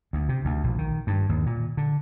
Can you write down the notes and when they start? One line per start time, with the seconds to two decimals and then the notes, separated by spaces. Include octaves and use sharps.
0.13 D2
0.29 C3
0.45 D2
0.64 A#1
0.78 D#3
1.07 G2
1.29 D#2
1.46 A#2
1.77 D3